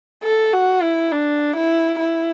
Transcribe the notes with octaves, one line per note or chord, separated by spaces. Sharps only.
A4
F#4
E4
D4
E4
E4